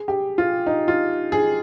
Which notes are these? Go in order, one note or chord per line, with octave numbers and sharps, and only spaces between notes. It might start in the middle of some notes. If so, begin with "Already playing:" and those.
Already playing: G#4
G4
F4
D#4
F4
G#4